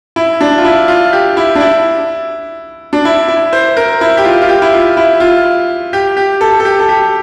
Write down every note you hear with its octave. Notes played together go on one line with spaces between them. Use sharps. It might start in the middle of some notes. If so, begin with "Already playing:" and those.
E4
D4
F4
E4
F4
G4
E4
D4
E4
D4
E4
E4
C5
A#4
E4
G4
F4
F4
G4
E4
F4
E4
F4
G4
G4
A4
A4
G4
A4
G4